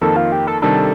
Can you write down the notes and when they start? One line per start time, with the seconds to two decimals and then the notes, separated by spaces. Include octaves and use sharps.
0.01 F2 D#3 A#3 A4
0.17 F4
0.32 G4
0.47 A4
0.62 C3 D#3 G3 D4 A4